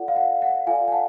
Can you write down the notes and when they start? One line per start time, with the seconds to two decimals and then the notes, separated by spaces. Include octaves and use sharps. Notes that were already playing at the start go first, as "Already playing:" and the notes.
Already playing: F4 A4 D5 F#5
0.08 F5
0.16 F#5
0.42 F#5
0.67 F4 A4 D5 F5 G#5
0.88 G#5
0.92 F#5 A5